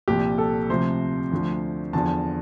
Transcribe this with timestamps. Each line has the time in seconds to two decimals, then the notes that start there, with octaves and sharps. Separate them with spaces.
0.08 C2 A#2 F3 G4
0.38 A4
0.69 D2 C3 F3 C5
1.32 D2 D3 F3
1.93 E2 D3 F3 A5